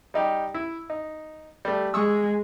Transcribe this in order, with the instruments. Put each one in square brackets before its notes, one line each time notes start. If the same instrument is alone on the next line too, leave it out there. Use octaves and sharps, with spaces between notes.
[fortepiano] G3 D#4 G4
E4
D#4
G3 A3
[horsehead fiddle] G#3 [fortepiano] C#6 D#6 E6